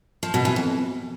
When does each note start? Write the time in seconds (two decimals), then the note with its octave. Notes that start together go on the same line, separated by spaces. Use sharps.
0.23 F3
0.34 B2
0.45 E3
0.56 F2